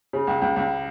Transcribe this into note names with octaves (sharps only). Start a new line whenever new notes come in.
C#3
C#2
C#2
C#2